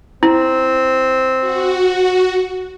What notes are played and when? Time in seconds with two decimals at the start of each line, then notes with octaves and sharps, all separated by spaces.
0.23 C4 E4
1.40 F#4